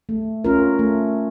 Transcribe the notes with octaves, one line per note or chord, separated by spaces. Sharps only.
A3
C#4 F4 A#4
A3